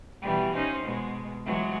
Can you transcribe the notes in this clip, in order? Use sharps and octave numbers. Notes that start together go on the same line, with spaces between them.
B2 E3 G3
C#4 D#4 C5
B2 G#3
E3 F#3 G#3